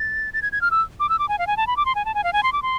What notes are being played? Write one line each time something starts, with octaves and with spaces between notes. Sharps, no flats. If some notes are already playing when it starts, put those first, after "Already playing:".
Already playing: A6
A6
G#6
G#6
F6
E6
D6
E6
D6
G#5
F5
G#5
A5
B5
D6
C6
G#5
A5
G#5
F5
G#5
C6
D6
C6